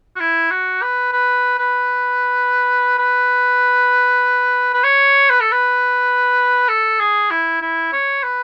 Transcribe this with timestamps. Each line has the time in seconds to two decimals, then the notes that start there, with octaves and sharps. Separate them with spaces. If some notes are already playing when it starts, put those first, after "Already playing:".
0.16 F#4
0.20 E4
0.51 F#4
0.82 B4
1.13 B4
1.59 B4
2.98 B4
4.74 B4
4.84 C#5
5.30 B4
5.41 A4
5.52 B4
6.68 A4
7.00 G#4
7.30 E4
7.62 E4
7.93 C#5
8.23 B4